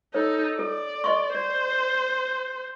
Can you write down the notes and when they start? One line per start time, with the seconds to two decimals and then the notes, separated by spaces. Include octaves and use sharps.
0.14 D#4 A4 C#5
0.59 A4 D5
1.04 D#5 C6 C#6
1.35 C5 D5